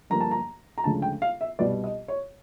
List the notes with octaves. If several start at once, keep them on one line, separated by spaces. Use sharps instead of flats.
G2 D3 F3 A#3 A#5
A5
A#5
A#5
D2 C#3 F3 G#3 A5
G5
F5
E5
C2 B2 G3 B3 D5
D#5
C#5